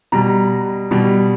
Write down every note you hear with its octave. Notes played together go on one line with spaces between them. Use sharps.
B2 G3 A#5
B2 G3